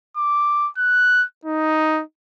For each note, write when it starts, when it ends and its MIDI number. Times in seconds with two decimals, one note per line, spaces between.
0.17 0.69 86
0.78 1.24 90
1.45 2.02 63